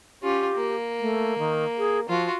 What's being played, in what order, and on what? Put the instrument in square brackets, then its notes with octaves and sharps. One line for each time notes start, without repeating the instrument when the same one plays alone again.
[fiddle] C#4 F4 [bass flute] G4
[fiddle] A#3
[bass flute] A3
D#3
G#4
[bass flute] F3 [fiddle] F4 F#4